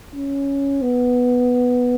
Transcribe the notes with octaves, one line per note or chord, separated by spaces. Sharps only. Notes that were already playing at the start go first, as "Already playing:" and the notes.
C#4
B3